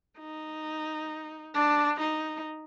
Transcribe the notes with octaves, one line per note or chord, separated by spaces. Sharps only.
D#4
D4
D#4